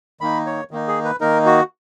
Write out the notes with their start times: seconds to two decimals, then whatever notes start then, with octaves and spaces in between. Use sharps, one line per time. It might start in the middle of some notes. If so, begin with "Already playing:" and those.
0.21 D#3 A#3 D#4 B5
0.46 C#5
0.71 D#3 A#3 D#4
0.88 G#4
1.05 B4
1.21 D#3 A#3 D#4 A#4
1.46 F#4